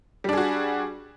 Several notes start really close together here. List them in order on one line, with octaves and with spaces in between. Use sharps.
G3 D4 G#4 F#4